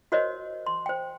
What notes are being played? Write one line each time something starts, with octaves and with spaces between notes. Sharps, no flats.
F#4 A#4 C5 C#5 D#5
C6
C5 G5